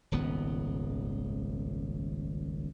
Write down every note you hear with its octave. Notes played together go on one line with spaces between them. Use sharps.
D#1 G#1 C#2 B3